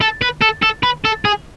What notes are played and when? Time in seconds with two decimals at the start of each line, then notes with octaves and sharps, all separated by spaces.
0.01 A4
0.22 B4
0.42 A4
0.63 A4
0.83 B4
1.05 A4
1.25 G#4